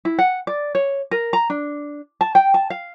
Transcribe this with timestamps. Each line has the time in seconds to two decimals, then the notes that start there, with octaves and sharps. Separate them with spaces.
0.05 E4
0.19 F#5
0.47 D5
0.75 C#5
1.11 A#4
1.33 A#5
1.50 D4
2.21 A5
2.35 G5
2.54 A5
2.70 F5